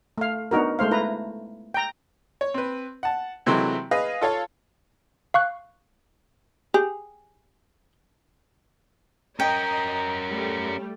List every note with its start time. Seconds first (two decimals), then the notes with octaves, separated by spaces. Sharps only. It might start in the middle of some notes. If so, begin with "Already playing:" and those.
0.18 A3 F5
0.51 B3 D4 D#4 F#4 A#4
0.79 G#3 A3 C5 F5
0.91 E4 B4 A#5
1.74 G5 A#5
2.41 C#5
2.54 C4 B4
3.03 F#5 A5
3.46 C3 E3 F#3 G#3 A3 C4
3.91 G#4 B4 D#5 F5
4.21 F4 A4 C#5 F5
5.34 F5 C#6 F#6
6.74 G4 G#4
9.40 C#4 A#4 D#5 G5 A#5
10.30 G3 A3